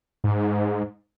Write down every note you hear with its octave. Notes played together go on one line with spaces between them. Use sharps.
G#2